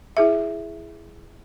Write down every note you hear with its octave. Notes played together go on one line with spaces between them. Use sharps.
E4 G#4 E5